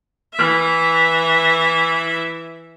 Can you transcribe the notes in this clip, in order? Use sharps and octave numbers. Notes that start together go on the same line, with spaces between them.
E3 E5